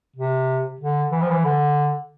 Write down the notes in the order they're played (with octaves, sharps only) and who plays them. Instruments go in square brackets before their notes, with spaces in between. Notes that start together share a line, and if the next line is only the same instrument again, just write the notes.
[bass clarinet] C3
D3
E3
F3
E3
D3